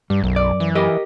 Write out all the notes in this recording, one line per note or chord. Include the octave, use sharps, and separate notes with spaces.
G2 G3
B1 F#2
D5
E3
G4 A#4 D#5